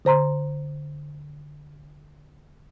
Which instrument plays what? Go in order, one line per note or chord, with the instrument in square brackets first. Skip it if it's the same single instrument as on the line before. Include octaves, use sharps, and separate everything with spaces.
[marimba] D3 C5 A#5 C6